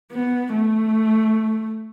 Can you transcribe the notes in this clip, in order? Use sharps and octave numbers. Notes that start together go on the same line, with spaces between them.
B3
A3